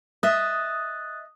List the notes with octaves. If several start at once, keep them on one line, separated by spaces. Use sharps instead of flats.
D#5 E5 D#6 F#6 A6